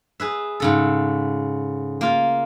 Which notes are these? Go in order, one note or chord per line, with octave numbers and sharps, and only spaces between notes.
G#4 B4 E5
G#2 C#3 A4
A#3 F4